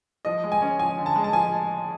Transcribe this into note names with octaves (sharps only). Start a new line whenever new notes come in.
F3 D#5
G#3
G#5
C#4
F3 G#5
D3
A5
G#3
A5
F3 G#5